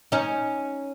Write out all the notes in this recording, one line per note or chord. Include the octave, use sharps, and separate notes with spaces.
C#4 D#4